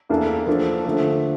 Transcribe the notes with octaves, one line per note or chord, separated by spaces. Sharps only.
E2 E3 A#3 D4 A4
F3 A#3 D4 A4
D3 F3 A3